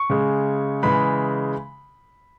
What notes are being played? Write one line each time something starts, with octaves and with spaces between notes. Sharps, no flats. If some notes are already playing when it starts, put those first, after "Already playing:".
Already playing: C#6
C#3 G#3
C#3 E3 G#3 B5